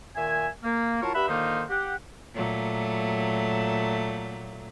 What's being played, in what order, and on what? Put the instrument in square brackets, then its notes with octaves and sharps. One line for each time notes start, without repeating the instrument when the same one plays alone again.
[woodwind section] A#2 D#3 E5 G#5
A#3
F#3 E4 F4 A#4 A5 C#6
G2 G4 E5 F#5 B5
D3 D#3 A#3 D#4 F4 C5
G4 F#5
[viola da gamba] A#2 F#3 A3